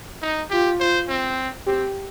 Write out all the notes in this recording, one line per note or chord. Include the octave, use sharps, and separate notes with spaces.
D#4
F4 G4
C5
C4
C4 G4